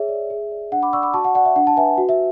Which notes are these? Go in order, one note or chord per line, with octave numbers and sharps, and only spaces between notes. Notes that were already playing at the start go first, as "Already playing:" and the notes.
Already playing: G#4 C#5 E5
D5
G#4
D5
D4 F#5
B5 D6
D5 C#6 E6
B5 D6
F#4 A5 C#6
F#5 A5
D5 F#5
E5
D4 F#5
A5
B4 E5 G#5
F#4
E5